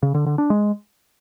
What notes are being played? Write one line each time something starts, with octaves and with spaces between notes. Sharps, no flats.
C#3
D3
D3
D4
G#3